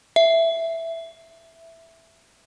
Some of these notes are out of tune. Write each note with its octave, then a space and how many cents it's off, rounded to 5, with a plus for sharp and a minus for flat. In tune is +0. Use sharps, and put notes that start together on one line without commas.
E5 +5